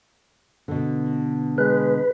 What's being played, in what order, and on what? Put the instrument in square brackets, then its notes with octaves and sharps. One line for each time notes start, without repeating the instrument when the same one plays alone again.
[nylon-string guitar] B2 D3
[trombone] G#3 [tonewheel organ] B4